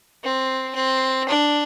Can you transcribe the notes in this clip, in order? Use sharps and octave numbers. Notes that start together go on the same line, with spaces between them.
C4
C4
D4